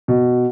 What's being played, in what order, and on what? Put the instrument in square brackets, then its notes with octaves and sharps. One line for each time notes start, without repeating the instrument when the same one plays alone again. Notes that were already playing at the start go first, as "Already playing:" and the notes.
[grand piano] B2